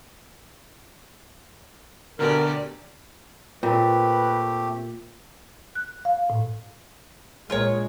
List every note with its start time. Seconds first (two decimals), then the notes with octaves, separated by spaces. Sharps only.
2.19 D2 B2 D3 G4 A#4 D5
3.63 A#2 A3 C4 G4 B4
5.75 F#6
6.05 F5
6.30 A2
7.50 A#1 A#2 G#3 F4 A#4 C#5